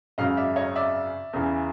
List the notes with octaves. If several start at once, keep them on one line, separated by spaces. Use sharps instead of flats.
G#1 F#2 C#3 D#5 F5
D5 E5
C#5 D#5
D5 E5
E2 C#3 E3